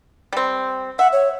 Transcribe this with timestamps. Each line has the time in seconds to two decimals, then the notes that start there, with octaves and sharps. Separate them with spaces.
0.33 G3 C4
0.99 E5 F#5
1.13 C#5